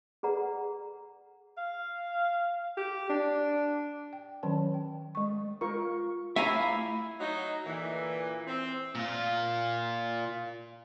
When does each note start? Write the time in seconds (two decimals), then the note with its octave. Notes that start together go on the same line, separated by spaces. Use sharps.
0.23 G#4 A4 B4 D5 F#5 A#5
1.57 F5
2.77 G4
3.09 D4
4.13 G5
4.43 D#3 F#3 C#4 D5 A5
4.74 G5
5.15 G#3 C#6
5.61 F4 A#4 C#6
6.36 A3 E4 E5 F5 G#5 A#5
7.20 F#3 D#4
7.65 A#2 D3 E3
8.47 C4
8.95 A#2 F4